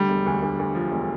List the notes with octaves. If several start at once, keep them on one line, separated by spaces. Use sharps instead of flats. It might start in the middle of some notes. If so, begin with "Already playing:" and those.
Already playing: D3 G3
E1
D2
D2
D2
F3
E1